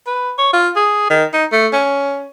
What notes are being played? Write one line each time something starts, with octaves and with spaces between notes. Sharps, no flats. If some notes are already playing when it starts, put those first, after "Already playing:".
B4
C#5
F4
G#4
D#3
D#4
A3
C#4